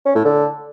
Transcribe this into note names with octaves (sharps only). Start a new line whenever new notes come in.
C#4
A2
D3